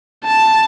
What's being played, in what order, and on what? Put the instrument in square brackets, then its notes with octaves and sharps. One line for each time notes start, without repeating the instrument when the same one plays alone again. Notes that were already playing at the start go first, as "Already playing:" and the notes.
[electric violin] A5